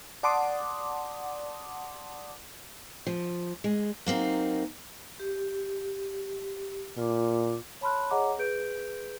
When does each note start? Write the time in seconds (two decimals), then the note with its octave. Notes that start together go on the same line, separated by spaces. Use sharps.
0.23 D5 F#5 A5 C6 D6 D#6
3.07 F3
3.64 G#3
4.06 F#3 A#3 C4 D#4
5.20 G4
6.98 A#2 F4 D6
7.81 C#5 A5 B5 C6 F6 F#6
8.11 G#4 C#5 D#5 F#5 A#5 D6
8.39 G#4 B4 G6 D7